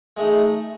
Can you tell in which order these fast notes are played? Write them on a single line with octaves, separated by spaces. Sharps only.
G#3 A3 D#4